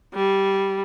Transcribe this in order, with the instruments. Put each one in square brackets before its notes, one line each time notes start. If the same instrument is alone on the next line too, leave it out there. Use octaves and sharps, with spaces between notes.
[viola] G3